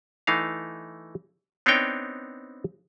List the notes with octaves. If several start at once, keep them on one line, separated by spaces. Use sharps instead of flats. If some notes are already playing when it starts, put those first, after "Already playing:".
E3 A3 D#4 F5
B3 C4 D4 D#4 C#5 G5